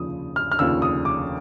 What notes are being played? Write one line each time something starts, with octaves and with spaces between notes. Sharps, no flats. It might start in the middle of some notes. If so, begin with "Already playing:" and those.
Already playing: F1 D#2 C#3 F3 D#6
F6
F6
F1 D#2 C#3 F3 E6
D#6
D6